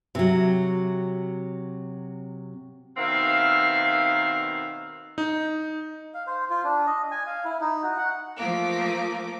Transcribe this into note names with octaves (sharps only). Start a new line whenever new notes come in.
C3 F#3
B2 D#3 C4 E5 F5
D#4
F5
C5
F4
D4
D#5
G#5
F5
E4
D#4
F#4
F#5
F3 A3 A#3 D6